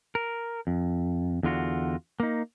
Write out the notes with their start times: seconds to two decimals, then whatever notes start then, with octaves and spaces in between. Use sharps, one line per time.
0.15 A#4
0.67 F2
1.43 E2 D3 F4 F#4
2.20 A#3 D#4